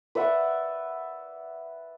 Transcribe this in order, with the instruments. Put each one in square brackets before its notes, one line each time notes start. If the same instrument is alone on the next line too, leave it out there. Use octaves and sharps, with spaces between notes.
[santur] B4 D5 E5 F#5